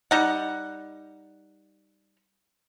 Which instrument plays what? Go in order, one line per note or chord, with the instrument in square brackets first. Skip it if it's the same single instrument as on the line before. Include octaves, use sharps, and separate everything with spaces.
[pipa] G3 D#4 F#5